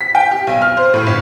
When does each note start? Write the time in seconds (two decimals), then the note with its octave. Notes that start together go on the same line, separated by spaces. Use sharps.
0.01 B6
0.15 G5
0.31 G4
0.47 B1
0.62 F6
0.77 C5
0.94 A2
1.06 G1